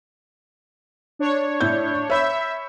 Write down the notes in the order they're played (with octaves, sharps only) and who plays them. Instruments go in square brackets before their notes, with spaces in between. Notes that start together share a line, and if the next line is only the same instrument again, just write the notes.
[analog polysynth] D4 C#5
[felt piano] A2 E5 G6
[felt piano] C#5 B5 G6 [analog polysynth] E5